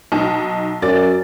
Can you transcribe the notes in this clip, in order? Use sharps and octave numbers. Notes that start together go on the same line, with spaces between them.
B1 D#4 A5
F#2 D5 A6